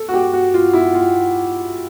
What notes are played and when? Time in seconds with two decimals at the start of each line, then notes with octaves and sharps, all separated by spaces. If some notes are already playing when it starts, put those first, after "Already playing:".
Already playing: A4
0.08 F#4
0.14 G4
0.33 F#4
0.54 F4
0.73 E4
0.94 F4